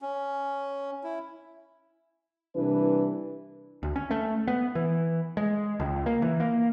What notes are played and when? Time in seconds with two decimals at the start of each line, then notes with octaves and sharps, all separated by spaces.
0.02 C#4
1.04 E4
2.56 C2 E3 D4 B4
3.83 D2
3.96 C#4
4.11 A3
4.48 B3
4.75 E3
5.37 G#3
5.80 C#2
6.06 A#3
6.22 E3
6.40 A#3